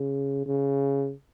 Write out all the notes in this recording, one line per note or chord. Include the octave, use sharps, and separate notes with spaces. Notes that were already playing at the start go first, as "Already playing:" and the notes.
Already playing: C#3
C#3